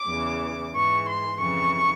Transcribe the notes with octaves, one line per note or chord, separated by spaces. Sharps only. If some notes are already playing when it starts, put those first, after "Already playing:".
Already playing: D6
E2 C#3 E3
G#2 E3 C#6
C6
F2 C#3 E3 C#6